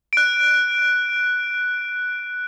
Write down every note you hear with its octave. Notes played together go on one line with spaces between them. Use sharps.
F#6 D7